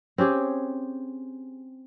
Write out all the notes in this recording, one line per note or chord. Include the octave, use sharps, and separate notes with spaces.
C4 C#4 G4 G#4